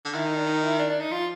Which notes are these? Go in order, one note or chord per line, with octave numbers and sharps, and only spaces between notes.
D3
D#3 E4
D#4
D4
D#4
E4
D4
D4
D#4
F3 F4